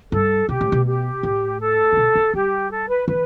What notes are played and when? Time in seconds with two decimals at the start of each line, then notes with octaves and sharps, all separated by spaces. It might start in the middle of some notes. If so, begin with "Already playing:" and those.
0.12 G2 A4
0.49 B2 G4
0.61 A2
0.72 B2
0.86 G4
1.23 A2
1.60 A4
1.92 D3
1.97 B2
2.15 D3
2.34 G3 G4
2.71 A4
2.89 B4
3.08 E3 B4